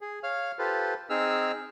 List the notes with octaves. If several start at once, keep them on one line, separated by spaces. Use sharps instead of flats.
G#4
C#5 F5 F6
F4 G4 A4 B4 C5
C4 D#4 G#4 E6 F6